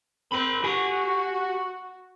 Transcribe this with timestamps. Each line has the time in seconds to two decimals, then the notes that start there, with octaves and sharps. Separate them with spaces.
0.32 C4 A#4 B5
0.64 F#4 G4 G#5